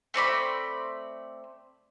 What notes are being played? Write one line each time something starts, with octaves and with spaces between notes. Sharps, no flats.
A3 C4 D5 B5